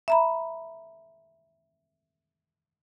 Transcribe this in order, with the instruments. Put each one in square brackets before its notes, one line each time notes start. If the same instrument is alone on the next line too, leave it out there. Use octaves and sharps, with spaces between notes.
[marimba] E5 A#5 B5